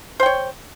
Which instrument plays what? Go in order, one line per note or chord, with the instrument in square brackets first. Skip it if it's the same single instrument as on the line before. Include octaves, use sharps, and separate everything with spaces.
[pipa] C5
G5
C#5